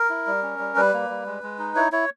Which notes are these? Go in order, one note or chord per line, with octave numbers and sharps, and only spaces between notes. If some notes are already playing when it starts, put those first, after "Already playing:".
Already playing: A#4
E4
G3
C#4
G3
G3 B4
A#3
G3
G#3
G#3
D#4
E4 C#5
E4 C#5